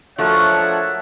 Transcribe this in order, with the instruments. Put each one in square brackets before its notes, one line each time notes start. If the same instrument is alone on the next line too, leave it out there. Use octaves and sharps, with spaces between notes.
[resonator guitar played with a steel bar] F3 A3 [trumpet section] D4 C#5 E5 [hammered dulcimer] F#4 A#4 [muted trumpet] F#5